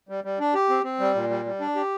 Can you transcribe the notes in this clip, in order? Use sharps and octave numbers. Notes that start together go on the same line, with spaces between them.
G3
G3
D4
G4
C4
C4
G3
A#2
G3
G3
D4
G4